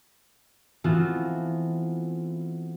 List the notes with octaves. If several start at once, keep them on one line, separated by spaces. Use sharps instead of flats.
E3 A3 B3 C4 F4 F#4